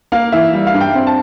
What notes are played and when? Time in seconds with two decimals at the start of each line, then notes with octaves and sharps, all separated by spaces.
0.12 A#3 F5
0.32 E3 E5
0.53 G3
0.67 F5
0.74 G2
0.81 G5
0.95 C4
1.07 A5